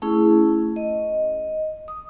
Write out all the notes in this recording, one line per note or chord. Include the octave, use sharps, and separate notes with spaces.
A3 C#4 E4 G#4
D#5
D#6